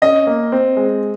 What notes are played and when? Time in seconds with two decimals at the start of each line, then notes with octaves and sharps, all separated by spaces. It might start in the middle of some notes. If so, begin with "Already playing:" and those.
0.02 C#4 D#5
0.27 A#3
0.52 C4
0.77 G#3